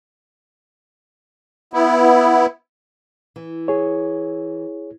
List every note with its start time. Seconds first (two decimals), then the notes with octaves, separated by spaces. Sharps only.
1.73 B3 E4
3.36 E3
3.68 G#4 C#5